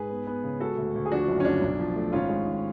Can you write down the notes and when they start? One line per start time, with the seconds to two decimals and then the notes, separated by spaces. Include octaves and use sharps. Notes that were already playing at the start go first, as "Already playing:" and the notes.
Already playing: G#2 G#4 B4
0.10 B3
0.27 B3
0.44 C#3
0.60 G#3 F#4 A4
0.77 D2
0.95 D2
1.06 G#4
1.11 F3 D4 F#4
1.28 F#1
1.40 C#4
1.45 F#1 D4
1.61 B1
1.79 F3
1.96 A3
2.12 G#1 C#4 F4
2.29 G#3
2.47 G#1